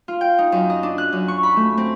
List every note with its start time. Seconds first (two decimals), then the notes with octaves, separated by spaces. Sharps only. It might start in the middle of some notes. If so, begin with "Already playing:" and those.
0.08 F4
0.21 G5
0.39 D#4
0.52 F#2
0.70 D#5
0.83 D4
0.98 F#6
1.12 F#2
1.28 C#6
1.43 B5
1.56 A3
1.78 C4